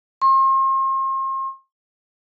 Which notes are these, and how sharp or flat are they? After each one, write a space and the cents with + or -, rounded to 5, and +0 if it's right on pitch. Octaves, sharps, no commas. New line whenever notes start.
C6 +40